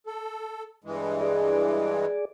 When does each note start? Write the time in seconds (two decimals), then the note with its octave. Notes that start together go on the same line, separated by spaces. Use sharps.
0.07 A4
0.84 G2 E3 G#3
1.21 G#4 D5